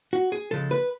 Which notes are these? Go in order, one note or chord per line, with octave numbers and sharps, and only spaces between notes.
F#4
G#4
C#3 F3 G#3 A4
B4